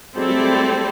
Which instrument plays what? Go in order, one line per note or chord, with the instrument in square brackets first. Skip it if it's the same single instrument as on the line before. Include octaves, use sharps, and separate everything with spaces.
[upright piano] F#3 G#3 [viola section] C4 E4 A4 D5
[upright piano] G3 A3
F#3 G#3
G3 A3